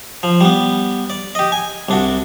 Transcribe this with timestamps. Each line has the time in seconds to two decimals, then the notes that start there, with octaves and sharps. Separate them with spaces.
0.23 F3
0.41 G3 B3
1.10 D5
1.35 G4 D#5
1.52 G#5
1.89 C2 D4 F#4